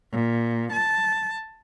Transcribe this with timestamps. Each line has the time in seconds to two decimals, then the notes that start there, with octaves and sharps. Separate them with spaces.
0.11 A#2
0.73 A5